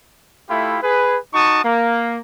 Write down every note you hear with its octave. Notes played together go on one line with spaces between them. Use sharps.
A3 E4 F4 G4 B5
G#4 B4
D#4 F#4 A5 C#6 D#6
A#3